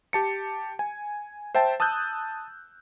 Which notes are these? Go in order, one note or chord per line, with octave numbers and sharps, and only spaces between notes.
G4 A5 C#7
G#5
C5 E5 G5 A5
A5 D#6 E6 F#6 G6